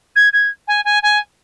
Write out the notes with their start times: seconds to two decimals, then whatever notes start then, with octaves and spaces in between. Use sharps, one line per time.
0.15 G#6
0.32 G#6
0.67 G#5
0.84 G#5
1.02 G#5